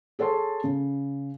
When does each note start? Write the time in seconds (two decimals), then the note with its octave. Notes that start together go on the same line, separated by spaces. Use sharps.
0.19 G#4 A4 C#5 A5 C6
0.64 C#3